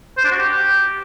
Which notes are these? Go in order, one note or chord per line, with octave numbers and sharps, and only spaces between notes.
C5
D4
F#4
G4